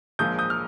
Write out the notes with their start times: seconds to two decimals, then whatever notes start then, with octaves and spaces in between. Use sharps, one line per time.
0.19 A#1 A#2 F3 G#3 D#6 G6
0.39 D#6 G6
0.50 F6